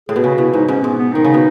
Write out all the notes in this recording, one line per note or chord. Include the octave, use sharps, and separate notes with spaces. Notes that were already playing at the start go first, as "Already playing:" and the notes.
A2 G#4
B2
C#3 F#4
B2 E4
G#2 D#4
G#2 C#4
G#2 B3
B3
D#3 D#4
C#3
B2